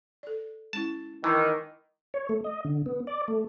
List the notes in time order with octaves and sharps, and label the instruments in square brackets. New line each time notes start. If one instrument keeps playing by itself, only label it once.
[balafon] A4 D5
[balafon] G#3 C#4 E4 [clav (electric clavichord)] A5
[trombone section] D#3 [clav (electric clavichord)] E3 [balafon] E4 A5
[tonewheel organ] C#5
A3
D#5
D3
B3
D5
A3